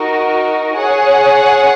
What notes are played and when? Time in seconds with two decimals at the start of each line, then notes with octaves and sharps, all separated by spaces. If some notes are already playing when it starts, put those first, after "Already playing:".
Already playing: D#4 F#4 A#4
0.75 G#4 C#5 F#5